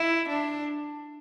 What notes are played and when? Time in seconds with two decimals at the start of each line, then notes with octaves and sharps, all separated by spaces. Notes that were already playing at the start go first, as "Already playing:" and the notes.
Already playing: E4
0.29 D4